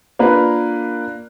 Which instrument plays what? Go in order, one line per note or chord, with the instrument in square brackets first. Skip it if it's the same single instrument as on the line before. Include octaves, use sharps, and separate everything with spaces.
[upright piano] A#3 D4 F4 A#4 B4